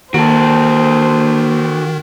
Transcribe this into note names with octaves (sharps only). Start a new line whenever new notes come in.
D#3 A#3 F#4 A4 C5